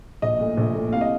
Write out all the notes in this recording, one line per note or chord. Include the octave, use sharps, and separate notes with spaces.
A#1 D#5
A#2 A3
A#1
A#2 A3
C2 F5
D#5